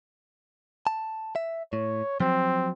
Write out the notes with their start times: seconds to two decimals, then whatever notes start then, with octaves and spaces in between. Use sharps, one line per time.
0.87 A5
1.36 E5
1.73 A2 C#5
2.20 F3 F#3 C4